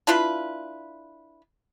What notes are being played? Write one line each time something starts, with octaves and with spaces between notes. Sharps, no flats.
D4 E4 F4 B4